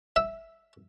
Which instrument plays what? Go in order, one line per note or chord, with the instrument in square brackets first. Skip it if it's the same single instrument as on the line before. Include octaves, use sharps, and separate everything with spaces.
[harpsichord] E5